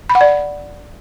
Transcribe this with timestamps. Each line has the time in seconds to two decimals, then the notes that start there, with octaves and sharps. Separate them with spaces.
0.09 B5
0.15 F#5
0.21 D5